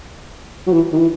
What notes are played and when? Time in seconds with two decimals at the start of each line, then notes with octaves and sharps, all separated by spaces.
0.67 F#3
0.73 E3
0.93 D#3
0.98 E3